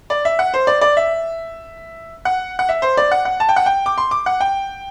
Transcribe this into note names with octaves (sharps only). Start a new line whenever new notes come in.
D5
E5
F#5
C5
D5
D5
E5
F#5
F#5
E5
C5
D5
F#5
F#5
A5
G5
F#5
G5
D6
C6
D6
F#5
G5